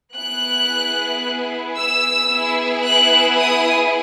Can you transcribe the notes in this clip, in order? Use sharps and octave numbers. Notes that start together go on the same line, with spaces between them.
B3 E4 G#4 F#6
E6
B3 E4 G#4
F#6
D#6